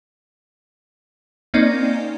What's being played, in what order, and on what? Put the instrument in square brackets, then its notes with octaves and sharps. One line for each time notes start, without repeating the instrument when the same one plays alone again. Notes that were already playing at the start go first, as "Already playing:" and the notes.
[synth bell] A#3 C4 C#4 D#4 D5 D#5